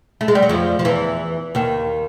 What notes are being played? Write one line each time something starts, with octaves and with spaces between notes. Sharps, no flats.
A3
G#3
G3
F#3
F2 F3
F3
E2 E3
D#2 D#3